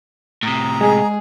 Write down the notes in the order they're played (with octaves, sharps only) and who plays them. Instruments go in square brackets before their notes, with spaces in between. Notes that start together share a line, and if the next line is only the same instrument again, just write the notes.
[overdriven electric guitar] A2 C3 [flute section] A#5 D#6
[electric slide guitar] G#3 [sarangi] G#4